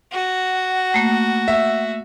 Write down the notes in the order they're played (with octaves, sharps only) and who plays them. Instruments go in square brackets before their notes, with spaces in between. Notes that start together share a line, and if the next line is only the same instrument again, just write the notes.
[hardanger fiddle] F#4 [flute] F#5
[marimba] A3 A#3
[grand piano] E5